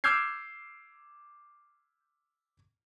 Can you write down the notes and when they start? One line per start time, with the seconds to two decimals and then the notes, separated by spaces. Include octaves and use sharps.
0.04 D6 E6 F6 G6 G#6 C7